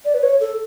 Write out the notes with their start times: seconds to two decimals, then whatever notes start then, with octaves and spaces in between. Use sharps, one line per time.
0.05 D5
0.14 B4
0.23 C#5
0.40 A4